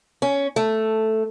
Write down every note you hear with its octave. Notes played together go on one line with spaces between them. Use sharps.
C#4
A3